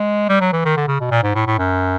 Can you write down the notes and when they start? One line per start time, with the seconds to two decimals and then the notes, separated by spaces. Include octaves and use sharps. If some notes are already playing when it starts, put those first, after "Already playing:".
Already playing: G#3
0.29 G3
0.41 F#3
0.53 E3
0.65 D#3
0.77 D3
0.88 C#3
1.01 B2
1.11 A#2
1.23 G#2
1.35 A2
1.47 A2
1.59 F#2